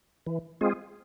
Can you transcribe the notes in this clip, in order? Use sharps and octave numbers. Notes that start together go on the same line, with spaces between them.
E3
G#3 C4 F4 G#4